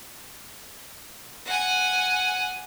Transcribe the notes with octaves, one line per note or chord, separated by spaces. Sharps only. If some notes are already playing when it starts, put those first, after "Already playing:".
F#5 G#5